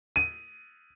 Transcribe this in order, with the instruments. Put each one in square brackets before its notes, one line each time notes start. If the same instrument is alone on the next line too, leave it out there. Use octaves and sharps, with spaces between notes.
[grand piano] D#7